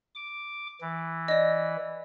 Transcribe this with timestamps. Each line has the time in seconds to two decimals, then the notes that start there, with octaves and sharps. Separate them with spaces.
0.15 D6
0.81 E3
1.28 D5 D#5